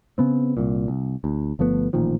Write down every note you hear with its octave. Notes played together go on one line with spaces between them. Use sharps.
C#3 B3 C4
C2 A#2
C2
D2
G1 F3 A3 B3
A1 A#2 D#3 F3